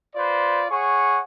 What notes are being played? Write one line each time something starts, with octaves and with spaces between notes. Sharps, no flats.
F4 B4 C5 D5
G#4 C#5 F#5 C#6